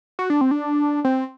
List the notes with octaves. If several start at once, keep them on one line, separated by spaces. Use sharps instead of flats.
F#4
D4
C4
D4
C4